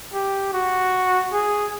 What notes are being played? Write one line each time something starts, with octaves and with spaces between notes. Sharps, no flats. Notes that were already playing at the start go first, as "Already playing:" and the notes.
G4
F#4
G#4